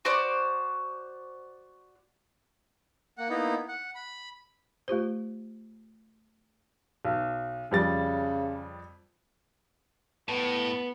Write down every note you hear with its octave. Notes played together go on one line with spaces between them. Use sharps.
F#4 C5 D5
A#3 F#5
A#3 B3 D#4 E4
F#5
B5
A3 F4 G4 C5
B1
F2 C#3 G3 A6
A2 B3